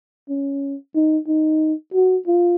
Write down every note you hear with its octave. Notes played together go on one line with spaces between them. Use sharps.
C#4
D#4
D#4
F#4
F4